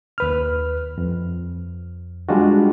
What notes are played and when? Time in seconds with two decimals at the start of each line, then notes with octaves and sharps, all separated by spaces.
0.18 D#2 B4 F6
0.98 F2
2.29 G3 G#3 D4 F4 F#4